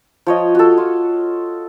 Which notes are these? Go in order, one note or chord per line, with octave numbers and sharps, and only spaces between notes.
F3 C#5 D#5
F#4 A4
F4